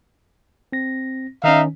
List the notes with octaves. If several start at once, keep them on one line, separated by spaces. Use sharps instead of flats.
C4 A#6
D#3 C#4 D#4 E5 F5